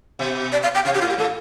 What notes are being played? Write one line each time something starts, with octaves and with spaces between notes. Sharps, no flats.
B2
D5
F5
G5
C3 F5
G4
A2 F4
G4
A2 A4